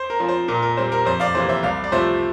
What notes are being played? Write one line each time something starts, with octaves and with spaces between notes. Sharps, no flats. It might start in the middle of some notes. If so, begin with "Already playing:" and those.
Already playing: C5
A#4
F3 C4
C5
A#2 A#4
A#4
G3 C4 C5
A#4
F2 C5
D5 F5
C3 E3 A#3 C5
C5 E5
C2 D5 F5
D5
C3 F3 A3 C5 E5